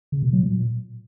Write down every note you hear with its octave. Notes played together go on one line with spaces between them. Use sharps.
C#3
B2
F#3
A#2